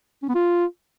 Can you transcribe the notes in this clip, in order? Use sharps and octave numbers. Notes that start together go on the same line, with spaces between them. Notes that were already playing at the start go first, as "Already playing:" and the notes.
C#4
B3
F4